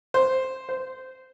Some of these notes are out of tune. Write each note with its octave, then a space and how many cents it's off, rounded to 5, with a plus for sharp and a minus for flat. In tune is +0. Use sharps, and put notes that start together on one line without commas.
C5 +0
C5 -15